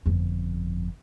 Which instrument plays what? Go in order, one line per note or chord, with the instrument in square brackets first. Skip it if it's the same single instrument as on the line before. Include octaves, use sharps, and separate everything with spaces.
[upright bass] G1 F2